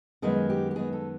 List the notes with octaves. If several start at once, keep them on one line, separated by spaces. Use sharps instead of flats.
F#2 D#3 G#3 B3 G#4
G4
G4
F#2 D#3 G#3 B3 G#4
A4